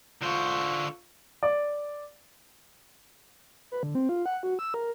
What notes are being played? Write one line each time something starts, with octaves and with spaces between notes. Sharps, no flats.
D3 F4 C5 F5 C#6
D5
B4
D3
C4
F4
F#5
F#4
E6
A#4